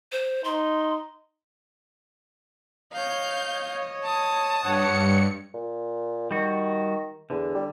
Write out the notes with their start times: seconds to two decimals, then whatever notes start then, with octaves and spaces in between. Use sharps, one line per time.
0.12 C5
0.44 D#4 C6
2.92 C#5 D#5 F5 G6
4.03 A5 D#6
4.63 G2 C#5 F#5 C#7
5.54 A#2
6.31 D#3 G3 F#4
7.30 E2 D3
7.55 G3